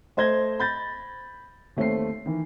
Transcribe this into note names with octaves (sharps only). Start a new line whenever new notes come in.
A3 C5 D#5 G#6 A#6 G7
B5 G6 A6 A#6
D#2 A3 C4 C#5 C7
D#3 E3